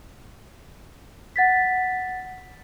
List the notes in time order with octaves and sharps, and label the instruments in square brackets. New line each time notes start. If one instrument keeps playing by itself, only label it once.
[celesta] F#5 A6 B6